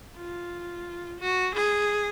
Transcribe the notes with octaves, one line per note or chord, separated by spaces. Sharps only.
F4
F#4
G#4